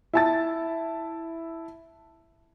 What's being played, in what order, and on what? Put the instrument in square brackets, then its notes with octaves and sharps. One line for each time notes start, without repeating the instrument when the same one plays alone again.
[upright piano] E4 A5 A6